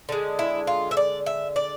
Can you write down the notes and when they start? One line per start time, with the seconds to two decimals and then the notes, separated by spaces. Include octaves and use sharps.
0.09 D3 G#3
0.39 E4
0.67 F4
0.91 E5
0.97 D5
1.26 E5
1.56 D5